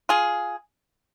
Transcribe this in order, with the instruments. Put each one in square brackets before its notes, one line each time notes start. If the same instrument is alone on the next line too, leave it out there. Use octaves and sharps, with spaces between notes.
[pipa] F4 G#4